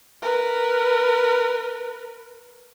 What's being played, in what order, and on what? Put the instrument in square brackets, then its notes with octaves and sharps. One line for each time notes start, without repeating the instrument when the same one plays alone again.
[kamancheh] A#4 B4